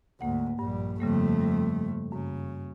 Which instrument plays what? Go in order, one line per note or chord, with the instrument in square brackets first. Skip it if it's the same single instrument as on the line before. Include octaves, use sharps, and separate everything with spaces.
[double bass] D2 G#2 [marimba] A#3 F#5
[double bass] A#1 G3 [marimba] G2
[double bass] F2 A3 [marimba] C#3 G3 A#3
[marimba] G3
[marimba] F#2 [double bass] C#3